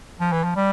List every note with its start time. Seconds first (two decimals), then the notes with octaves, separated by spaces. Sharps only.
0.19 F3
0.32 E3
0.44 F3
0.56 G3